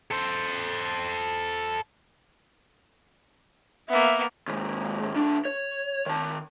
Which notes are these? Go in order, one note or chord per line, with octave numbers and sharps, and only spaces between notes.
A4 C5
A#3 B3 E5
D#2 G#2
D#2 D4
C#5
D#3 A5